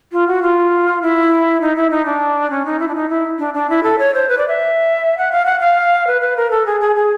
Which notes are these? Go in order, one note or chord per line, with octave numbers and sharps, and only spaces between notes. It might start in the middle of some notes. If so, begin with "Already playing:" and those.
F4
F#4
F4
E4
D#4
E4
D#4
D4
C#4
D#4
E4
D4
D#4
E4
D4
D4
E4
A4
C#5
C5
B4
D5
E5
F#5
F5
F#5
F5
B4
B4
A#4
A4
G#4
G#4
G#4